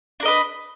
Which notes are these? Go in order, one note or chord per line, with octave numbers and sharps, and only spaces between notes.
D4 A#4 B4 D#5